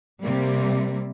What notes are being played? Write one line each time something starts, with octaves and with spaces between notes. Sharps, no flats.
C3 G3 A#3